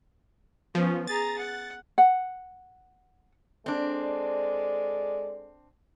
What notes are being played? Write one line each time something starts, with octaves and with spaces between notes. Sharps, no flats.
F3 B3 C#4
G#4 A#5 A6
F#5
F#5
G#3 C4 D4 A4 D5